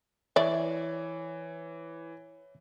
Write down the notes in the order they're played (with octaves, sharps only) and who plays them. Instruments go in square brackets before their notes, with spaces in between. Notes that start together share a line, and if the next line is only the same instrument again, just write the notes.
[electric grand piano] E3 [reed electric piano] C#5 [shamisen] D5 E5